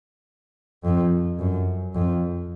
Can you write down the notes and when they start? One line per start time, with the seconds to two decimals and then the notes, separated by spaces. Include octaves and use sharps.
0.84 F2
1.39 F#2
1.94 F2